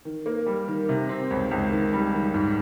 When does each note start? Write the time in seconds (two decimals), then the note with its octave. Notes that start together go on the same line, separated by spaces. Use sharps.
0.05 D#3
0.26 A#3
0.46 G3
0.68 D#3
0.89 C3
1.09 C4
1.31 C#2
1.51 C#2
1.71 D#3
1.93 G3
2.14 D#3
2.34 G#2